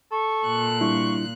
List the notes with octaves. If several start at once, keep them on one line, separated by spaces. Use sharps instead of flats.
A4 C#6
A#2 F#6
G3 D4 E4 C#6